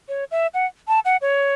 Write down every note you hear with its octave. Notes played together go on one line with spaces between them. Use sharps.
C#5
E5
F#5
A5
F#5
C#5